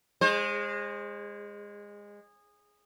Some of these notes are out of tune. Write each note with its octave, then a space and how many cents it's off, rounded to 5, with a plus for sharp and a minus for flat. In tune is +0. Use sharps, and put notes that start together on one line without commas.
G#3 -20 C5 +30